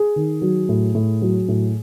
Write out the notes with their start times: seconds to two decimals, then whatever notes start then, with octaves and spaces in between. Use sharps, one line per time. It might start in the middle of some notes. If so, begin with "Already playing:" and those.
Already playing: G#4
0.16 D#3
0.42 F#3
0.69 A2
0.95 A2
1.22 F#3
1.48 A2